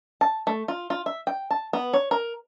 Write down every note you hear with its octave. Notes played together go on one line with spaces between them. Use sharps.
A5
A3
F4
F4
E5
G5
A5
B3
C#5
A#4